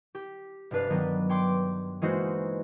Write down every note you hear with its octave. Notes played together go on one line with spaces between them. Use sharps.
G4
F1 G2 D4 B4 F5
G2 D#3 F#3 B3 D4
C#5 G5 C6 D6
E3 G#3 A#3 D#4 F#4 C5